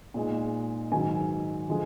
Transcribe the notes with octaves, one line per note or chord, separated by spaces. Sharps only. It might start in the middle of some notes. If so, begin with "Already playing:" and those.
A#2 G#3 D#4
G#2 D#3 F#3 G#5
D3 F3 G#3